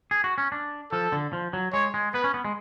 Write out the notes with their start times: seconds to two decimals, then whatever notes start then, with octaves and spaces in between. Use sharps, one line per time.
0.11 G#4
0.24 F#4
0.38 C#4
0.52 D4
0.92 F3 A4
1.12 D3
1.33 F3
1.53 F#3
1.73 G#3 C#5
1.94 G#3
2.14 B3 B4
2.24 C#4
2.34 B3
2.45 G#3